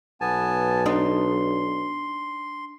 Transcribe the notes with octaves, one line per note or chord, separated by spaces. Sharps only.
B1 B3 G#5 A5
D4 D#4 C6